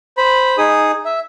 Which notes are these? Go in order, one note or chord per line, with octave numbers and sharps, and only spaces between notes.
C5 B5
D#4 G#4 D#6
E5